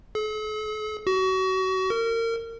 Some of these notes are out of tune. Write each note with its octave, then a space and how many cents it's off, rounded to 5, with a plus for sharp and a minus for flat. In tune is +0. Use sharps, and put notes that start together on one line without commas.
A4 -45
F#4 +30
A#4 -30